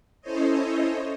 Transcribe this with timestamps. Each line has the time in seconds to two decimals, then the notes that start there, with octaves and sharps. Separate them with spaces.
0.21 C#4 E4 A4 C5 C#5 D#5